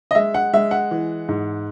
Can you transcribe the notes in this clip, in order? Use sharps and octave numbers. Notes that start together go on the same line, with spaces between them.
D#5
G#3 E5
F#5
G#3 E5
F#5
E3
G#2